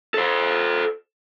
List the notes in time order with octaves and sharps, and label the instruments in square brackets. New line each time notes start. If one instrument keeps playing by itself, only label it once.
[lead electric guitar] A4 C5